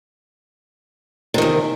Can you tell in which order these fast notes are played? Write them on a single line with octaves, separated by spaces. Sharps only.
C3 D#3 E2